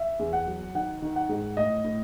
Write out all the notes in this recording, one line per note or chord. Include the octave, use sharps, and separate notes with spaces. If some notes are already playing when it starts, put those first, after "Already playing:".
Already playing: E5
E2
F#5
F#3
D#3 F#5
D#3
F#5
G#2
A2 D#5
A2